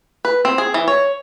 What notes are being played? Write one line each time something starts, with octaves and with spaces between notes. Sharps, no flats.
B4
C4
G#4
E3
C#5